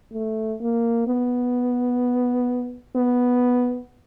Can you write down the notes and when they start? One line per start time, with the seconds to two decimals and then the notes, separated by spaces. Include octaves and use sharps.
0.13 A3
0.60 A#3
1.07 B3
2.96 B3